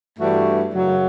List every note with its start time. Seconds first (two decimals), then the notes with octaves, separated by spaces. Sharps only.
0.19 G2 E3 A3 D4 F#4
0.75 F#2 C#3 F#3